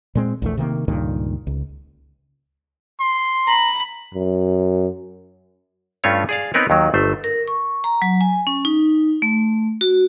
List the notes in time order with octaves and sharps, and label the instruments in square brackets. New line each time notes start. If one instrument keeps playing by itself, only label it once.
[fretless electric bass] A#2 G#3 C4
A#1 E2 A3
C3 D#3 F3 A#3
C#2 G2 A#2 D#3
C#2
[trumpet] C6
[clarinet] A#5 [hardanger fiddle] B5
[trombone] F#2
[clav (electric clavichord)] G2 A3 C#4 F4 C#5
G#4 D5 F5
B3 C4 D#4 A#4 B4 C#5
D#2 D#3 F#3
G1 A3 C5
[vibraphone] A#4
C#6
A#5
F#3
G#5
C#4
D#4
A3
F#4